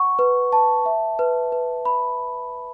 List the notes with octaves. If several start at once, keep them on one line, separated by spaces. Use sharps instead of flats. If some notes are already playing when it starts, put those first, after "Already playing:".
Already playing: F#5 C#6
B4
A5
E5
B4
B4
B5